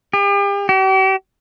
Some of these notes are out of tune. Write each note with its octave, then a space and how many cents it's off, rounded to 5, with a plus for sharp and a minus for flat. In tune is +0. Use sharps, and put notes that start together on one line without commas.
G4 +40
G4 -45